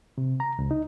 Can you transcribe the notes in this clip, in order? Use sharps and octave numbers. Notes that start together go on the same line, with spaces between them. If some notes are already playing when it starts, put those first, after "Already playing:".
C3
A#5
C#2
D#4